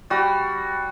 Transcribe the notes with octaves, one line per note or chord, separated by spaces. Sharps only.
G3 F#4